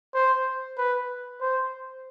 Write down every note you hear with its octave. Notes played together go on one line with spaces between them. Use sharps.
C5
B4
C5